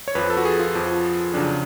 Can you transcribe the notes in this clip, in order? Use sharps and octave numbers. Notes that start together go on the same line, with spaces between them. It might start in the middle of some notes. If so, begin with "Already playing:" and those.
C#5
F2 F3 B4
A4
F#4
G#4
F4
F2 F3
F2 C#3 F#3 D4